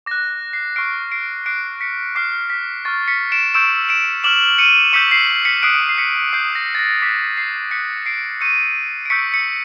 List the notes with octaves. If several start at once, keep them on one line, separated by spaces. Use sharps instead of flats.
D6 F#6 A#6
C7
C#6 F6 C7 D7
C7 D7
D6 F#6 C7 D7
B6 C#7
D6 F6 C7
B6
C#6 F6 A6
B6 C#7
D7 E7
C#6 E6 G6 D7 E7
D7 E7
D6 F6 E7 F#7
C#7 D#7
C#6 E6 G6 B6 C#7
C7
C7
B6 C#7
D#6 F#6 C7 D7
C7
B6 C#7
D#6 G6 C7
A#6
A6
A#6
D6 F#6 B6
C7
D#6 F#6 B6 C#7
C7 D7
C#6 E6 G6 C#7 D#7
D7
C#6 E6 G6 B6 C#7
B6 C#7